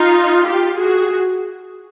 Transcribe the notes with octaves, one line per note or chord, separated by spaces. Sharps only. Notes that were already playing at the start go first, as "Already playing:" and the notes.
Already playing: D#4 F4
F4 G4
F#4 G#4